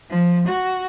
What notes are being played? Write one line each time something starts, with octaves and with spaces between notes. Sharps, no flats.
F3
F#4